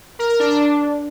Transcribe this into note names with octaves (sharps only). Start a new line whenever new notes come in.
A#4
A#4
D4
D4